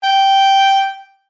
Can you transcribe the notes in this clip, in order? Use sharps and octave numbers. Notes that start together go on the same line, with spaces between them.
G5